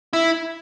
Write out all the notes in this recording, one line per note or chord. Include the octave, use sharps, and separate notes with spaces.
E4